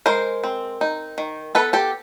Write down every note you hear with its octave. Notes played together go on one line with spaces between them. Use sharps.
G#3 A#4 C5
C4
D#4
D#3
B3 A4 B4
G4 A4